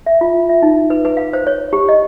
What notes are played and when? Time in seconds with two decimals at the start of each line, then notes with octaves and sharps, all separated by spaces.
0.06 E5
0.21 F4
0.49 E5
0.62 D#4
0.90 B4
1.05 B4
1.17 F5
1.33 C5
1.47 C#5
1.73 G4
1.89 D#5